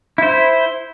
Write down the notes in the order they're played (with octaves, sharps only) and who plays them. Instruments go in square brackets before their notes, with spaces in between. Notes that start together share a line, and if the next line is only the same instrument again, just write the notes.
[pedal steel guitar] E4 C5